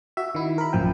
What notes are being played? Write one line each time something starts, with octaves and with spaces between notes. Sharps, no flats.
F#4 E5
D#3 E4
A#4 B5
A1 F#2 A#2 F3 G5